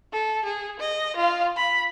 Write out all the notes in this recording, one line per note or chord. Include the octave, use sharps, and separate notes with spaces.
A4
G#4
D#5
F4 F5
B5